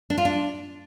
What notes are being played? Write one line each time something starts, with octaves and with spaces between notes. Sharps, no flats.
D4
F4
D4